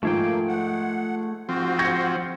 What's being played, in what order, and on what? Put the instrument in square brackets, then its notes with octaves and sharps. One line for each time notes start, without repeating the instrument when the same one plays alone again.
[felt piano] G#2 F3 [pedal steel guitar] A3 G#4 G5 [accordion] A#3
[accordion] F#5
[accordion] G#2 F#4 [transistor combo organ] F3 C4
[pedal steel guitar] F#5 G5 [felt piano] C#6 G#6 A#6